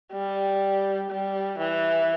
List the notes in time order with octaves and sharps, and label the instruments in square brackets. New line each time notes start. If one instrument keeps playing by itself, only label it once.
[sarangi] G3
G3
E3